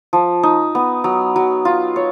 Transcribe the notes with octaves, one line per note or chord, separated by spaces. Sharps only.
F3
D#4
B3
F#3
F#3
F4
C#5